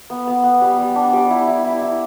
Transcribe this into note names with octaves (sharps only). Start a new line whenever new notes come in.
B3
B3
B3
G3
G3
D4
G3 D6
E4
E4
E4
E4